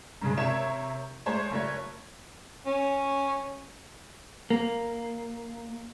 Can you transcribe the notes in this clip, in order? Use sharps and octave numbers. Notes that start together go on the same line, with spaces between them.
G2 C#3 G#3
C3 A#4 C#5 E5 E7
G#3 A3 C5 C#5
F#1 A3 C#5
C#4
A#3